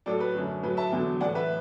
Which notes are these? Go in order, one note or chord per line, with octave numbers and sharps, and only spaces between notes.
A2 F#3 A4 D5
B4
F#2 D3 F#3
A2 F#3 B4
E5 A5
E2 D3 F#3
A2 E3 D5 F#5
B4 E5